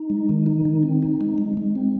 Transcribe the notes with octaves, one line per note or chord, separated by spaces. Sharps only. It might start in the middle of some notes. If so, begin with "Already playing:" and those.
Already playing: D#4
G#3
D#3
D#4
D#3
C4
D#4
G#3
G#3
G#3
C4